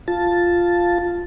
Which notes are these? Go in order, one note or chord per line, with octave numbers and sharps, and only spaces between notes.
F4 A5